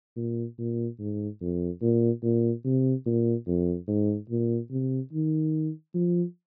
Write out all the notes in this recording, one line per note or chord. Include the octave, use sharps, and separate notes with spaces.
A#2
A#2
G#2
F2
A#2
A#2
C3
A#2
F2
G#2
A#2
C3
D#3
F3